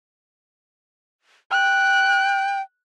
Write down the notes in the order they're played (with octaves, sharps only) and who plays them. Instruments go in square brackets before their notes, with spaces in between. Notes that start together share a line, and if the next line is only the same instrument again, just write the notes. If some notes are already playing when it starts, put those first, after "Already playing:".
[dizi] G5 [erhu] F#6